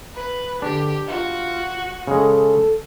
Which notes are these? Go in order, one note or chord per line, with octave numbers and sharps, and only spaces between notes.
B4
D3 D4 G4
F4 F#4
C#3 G#3 A4